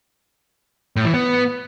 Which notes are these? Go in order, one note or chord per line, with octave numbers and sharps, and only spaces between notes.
A2
E3
B3